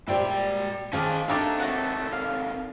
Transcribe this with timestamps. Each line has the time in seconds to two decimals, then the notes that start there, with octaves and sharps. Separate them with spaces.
0.08 A#2 G3 G#3 E4 G4 C5 G5
0.93 D#3 F3 C#4 F4 G4 G#4 A5
1.28 A3 A#3 C4 D4 D#4 G4 A4
1.60 D#2 C3 A3 F#4 F#5
2.12 F5